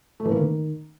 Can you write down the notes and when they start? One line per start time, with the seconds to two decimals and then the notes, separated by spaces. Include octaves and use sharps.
0.20 A3
0.25 E3
0.31 A#3
0.37 D#3